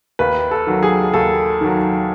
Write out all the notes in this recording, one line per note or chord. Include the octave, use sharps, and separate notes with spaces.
D#2 B4
A4
D#3 F#3
G#4
D#2 A4
D#3 F#3